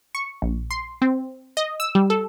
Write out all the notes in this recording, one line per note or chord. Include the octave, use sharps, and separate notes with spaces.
C#6
A#1
C6
C4
D#5
E6
G3
A4